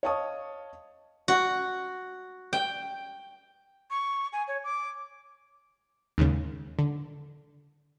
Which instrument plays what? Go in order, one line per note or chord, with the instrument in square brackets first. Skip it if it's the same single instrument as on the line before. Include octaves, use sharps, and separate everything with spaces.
[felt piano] C#5 D#5 F5 A5 C#6 D#6
[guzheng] F#4
G5
[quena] C#6
G#5
C#5
D6
[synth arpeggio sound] D#2 G#2 C#3
D3